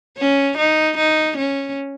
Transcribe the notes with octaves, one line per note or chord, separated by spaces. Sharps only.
C#4
D#4
D#4
C#4